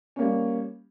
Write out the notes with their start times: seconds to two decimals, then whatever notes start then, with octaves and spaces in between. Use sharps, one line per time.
0.16 C#4
0.19 A#3
0.22 G3